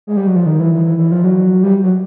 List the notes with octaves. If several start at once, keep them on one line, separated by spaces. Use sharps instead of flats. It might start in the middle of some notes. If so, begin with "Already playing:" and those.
G#3
G3
F#3
F3
D#3
E3
E3
E3
E3
F3
F#3
G3
F#3